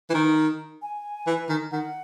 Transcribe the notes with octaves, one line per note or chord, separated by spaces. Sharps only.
E3
D#3
G#5
E3
D#3
D#3 F#5